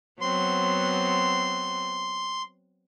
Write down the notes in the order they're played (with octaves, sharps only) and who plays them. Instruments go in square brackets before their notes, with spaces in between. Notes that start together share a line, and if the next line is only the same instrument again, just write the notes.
[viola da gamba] F#3 B3 C4 [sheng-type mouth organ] C6